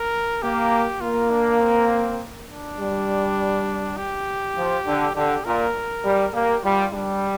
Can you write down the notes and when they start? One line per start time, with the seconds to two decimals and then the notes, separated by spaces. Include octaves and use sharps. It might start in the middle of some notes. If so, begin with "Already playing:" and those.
Already playing: A#4
0.42 A#3 G4
1.01 A#3 F4
1.31 D4
1.61 C4
2.49 D4
2.78 G3
3.97 G4
4.56 F3
4.86 D3
5.15 D3 G4
5.45 A#2 A#4
6.05 G3
6.33 A#3 G4
6.63 G3 F4
6.93 G3 D4